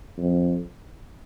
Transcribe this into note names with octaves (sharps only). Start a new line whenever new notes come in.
F2